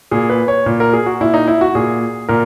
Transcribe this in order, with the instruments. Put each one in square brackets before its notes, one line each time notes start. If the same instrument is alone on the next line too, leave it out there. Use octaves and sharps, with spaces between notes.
[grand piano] A#2 G#4
B4
C#5
A#2
A#4
G#4
F#4
A#2 E4
D#4
E4
F#4
A#2 G#4
A#2 A#4